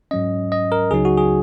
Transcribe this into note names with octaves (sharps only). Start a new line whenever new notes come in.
G#2 F#3 C#4 D#5
D#5
A#4
C#2 C#3 F#3 D#4 G#4
F#4
G#4